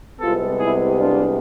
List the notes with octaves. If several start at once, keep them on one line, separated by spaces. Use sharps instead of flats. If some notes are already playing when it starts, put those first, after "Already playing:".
C2 C3 G#3 B3 F4 A4
E4 G#4
D4 F4